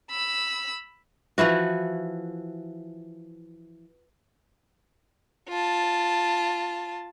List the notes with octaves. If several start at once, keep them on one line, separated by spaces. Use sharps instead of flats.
B5 E6
E3 F3 E4 F#4
F4 A5